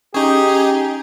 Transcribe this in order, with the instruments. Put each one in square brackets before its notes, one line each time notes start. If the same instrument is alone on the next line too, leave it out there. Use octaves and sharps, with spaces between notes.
[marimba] C#4 [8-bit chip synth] D#4 G#4 [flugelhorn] G4